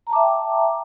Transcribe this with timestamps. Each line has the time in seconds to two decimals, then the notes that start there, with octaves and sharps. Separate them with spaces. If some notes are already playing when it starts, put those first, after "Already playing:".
0.07 A#5
0.10 A5
0.13 D6
0.16 E5
0.19 G5